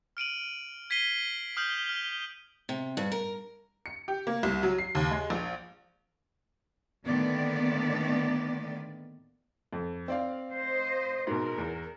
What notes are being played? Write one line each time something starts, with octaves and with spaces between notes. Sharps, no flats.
F6 D7 D#7 F#7
G#6 B6 C7 D#7 G7
D#6 F6 G6 F#7
F6
C3
G2
A#4
C#7
G4
A#3
C2
F#3
C7
D#2
G#3
A#1
A2 D3 D#3 A#3 B3 D5
F2
C4 D5 F5
C5 D#5
G#2 B2 A#4
E2